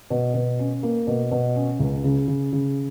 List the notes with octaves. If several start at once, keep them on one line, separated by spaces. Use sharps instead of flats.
B2
B2
C#4
A#3
B2
B2
C#4
C#2
C#3
C#3
C#3